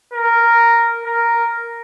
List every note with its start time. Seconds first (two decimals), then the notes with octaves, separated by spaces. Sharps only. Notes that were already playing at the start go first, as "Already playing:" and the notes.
0.13 A#4
1.05 A#4